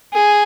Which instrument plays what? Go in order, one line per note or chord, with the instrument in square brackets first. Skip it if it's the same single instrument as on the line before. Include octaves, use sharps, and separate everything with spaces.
[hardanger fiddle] G#4